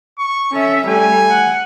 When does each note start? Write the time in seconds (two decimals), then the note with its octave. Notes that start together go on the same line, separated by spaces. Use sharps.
0.18 C#6
0.53 C#4 A4 E5
0.87 G3 A3 G#5
1.30 F#5